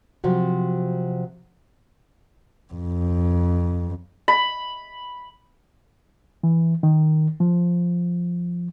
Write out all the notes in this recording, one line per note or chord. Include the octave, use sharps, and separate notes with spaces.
C3 F3 F#3 F#4
F2
B5
E3
D#3
F3